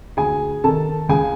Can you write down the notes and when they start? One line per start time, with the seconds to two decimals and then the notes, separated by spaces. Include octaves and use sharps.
0.17 D2 G#4 G#5
0.64 C3 D#3 A4 A5
1.09 C#2 G#4 G#5